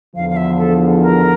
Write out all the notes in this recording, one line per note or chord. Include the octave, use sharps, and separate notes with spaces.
E2 D3 F3 F5
F5
E5
A4
A#4